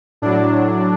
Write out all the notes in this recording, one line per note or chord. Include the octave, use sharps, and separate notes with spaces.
A2 F#3 D4